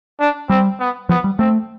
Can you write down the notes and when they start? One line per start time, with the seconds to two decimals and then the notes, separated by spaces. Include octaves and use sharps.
0.20 D4
0.49 G3 C4
0.80 B3
1.09 F3 B3
1.24 G3
1.39 A3 C4